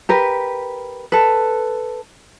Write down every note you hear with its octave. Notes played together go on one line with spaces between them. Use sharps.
G4 A#4 B4
A4 B4